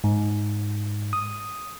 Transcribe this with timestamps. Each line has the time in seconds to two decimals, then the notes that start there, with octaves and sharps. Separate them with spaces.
0.04 G#2
1.13 D#6